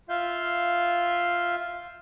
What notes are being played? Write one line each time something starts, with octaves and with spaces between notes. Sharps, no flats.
F4 E5 F5 G6